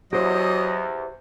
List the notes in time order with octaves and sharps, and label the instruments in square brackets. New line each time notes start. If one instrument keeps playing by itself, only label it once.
[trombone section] E2 [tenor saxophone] F#3 [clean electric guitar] G4 C5 [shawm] D#5